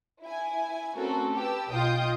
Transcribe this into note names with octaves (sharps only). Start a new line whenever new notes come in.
E4 G#5
A3 C4 C#4 F#4 A4 A#4
G4 B4 A5 E6
B1 F4 D#5 G5 D#6 G6